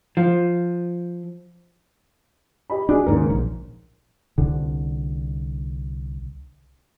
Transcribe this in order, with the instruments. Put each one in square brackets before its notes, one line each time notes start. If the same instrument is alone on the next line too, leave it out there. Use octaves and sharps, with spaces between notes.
[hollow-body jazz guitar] F3
[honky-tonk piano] G4 D#5 B5
[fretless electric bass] D4 [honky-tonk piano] F#4 G#4
[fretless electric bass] D#2 G#2 C#3 [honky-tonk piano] A#4
[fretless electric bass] A#1
[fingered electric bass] C2 D3